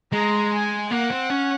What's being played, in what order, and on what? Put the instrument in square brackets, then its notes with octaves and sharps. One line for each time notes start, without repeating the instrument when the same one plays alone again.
[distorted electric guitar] G#3 [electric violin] A#5
[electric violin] G#5
[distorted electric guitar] A#3 [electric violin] F#5
[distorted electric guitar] C4
C#4